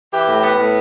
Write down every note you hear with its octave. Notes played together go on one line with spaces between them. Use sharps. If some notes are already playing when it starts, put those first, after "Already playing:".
E3 G4
A2
B3
A2